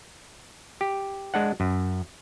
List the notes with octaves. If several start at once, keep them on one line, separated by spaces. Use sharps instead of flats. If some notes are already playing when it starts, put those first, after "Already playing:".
G4
G#3 D4 F#5
F#2